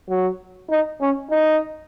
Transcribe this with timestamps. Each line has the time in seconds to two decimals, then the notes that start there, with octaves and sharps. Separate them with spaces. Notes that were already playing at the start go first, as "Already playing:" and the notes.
0.09 F#3
0.70 D#4
1.01 C#4
1.31 D#4